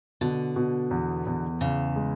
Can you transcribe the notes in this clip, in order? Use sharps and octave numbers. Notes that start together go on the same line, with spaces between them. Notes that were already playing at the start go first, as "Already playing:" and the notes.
B2 D3
B2
E2
E2
E2 C#3
G#3